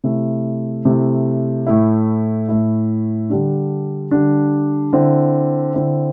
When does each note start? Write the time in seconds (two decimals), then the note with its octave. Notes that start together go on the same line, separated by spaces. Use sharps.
0.04 C3 A3 E4
0.85 C3 A3 E4
1.67 A2 A3 E4
2.49 A2 A3 E4
3.30 D3 G3 D4
4.11 D3 G3 D4
4.93 D3 C4 E4
5.74 D3 C4 E4